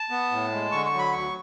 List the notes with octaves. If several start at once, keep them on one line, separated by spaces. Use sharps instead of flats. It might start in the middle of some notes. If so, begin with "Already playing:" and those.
Already playing: A5
B3
A2
G#3
D3 C#6
C#6
F#3
B5
D2 C#6